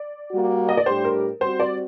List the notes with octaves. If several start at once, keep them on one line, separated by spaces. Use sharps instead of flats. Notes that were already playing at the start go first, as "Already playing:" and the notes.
Already playing: D5
G3 A#3 F#4
D#5
D5
A2 G3 D4 G4 C5
A#4
G3 C4 F#4 C5
D5